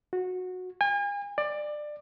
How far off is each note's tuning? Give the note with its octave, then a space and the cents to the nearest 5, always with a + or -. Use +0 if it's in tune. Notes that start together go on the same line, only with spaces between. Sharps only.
F#4 -15
G#5 -40
D5 +20